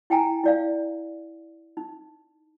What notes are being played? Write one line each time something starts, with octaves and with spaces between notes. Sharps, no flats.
E4 G5 G#5 A#5
E4 D5 F5
D#4